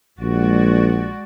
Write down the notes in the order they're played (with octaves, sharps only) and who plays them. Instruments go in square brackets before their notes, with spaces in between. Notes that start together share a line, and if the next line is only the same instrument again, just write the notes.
[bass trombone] A#1 [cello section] G#3 F#4 D5